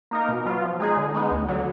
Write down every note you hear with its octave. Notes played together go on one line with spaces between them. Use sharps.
A#3 D#4 A#4
B2
F#3 B3 F4
F3
G#3 D#4 G#4
D3
G#3 B3 D#4
D2
D3 F#3